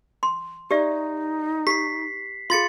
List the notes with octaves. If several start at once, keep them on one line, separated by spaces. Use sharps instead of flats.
C6
D#4 G4 D5 E5
G4 B6 C7
F4 G#4 F5 C6 A6 C#7